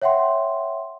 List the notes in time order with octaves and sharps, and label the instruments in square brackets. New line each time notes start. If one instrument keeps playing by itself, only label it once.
[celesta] C#5 E5 F#5 G5 C6